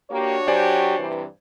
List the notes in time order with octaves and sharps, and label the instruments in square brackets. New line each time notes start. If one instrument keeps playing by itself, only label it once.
[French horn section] A#3 G4 [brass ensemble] D4 F#4 C#5
[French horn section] F#3 G4 [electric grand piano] C5 D5 G#5
[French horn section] G2 C3 E3